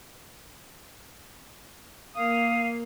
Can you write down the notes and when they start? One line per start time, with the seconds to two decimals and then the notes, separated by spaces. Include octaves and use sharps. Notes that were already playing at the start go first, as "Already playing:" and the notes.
2.16 A#3 F5 D#6